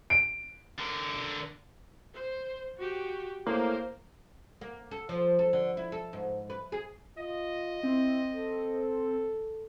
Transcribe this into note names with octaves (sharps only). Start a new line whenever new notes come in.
D7
D3 A#4
C5
F#4 G4
A2 A#3 C5
A#3
A4
F3
A4
D3
E4
A4
G#2
B4
G#4
F4 D#5
C4 E4
A4